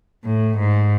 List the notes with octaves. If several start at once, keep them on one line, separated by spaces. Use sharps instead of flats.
A2
G#2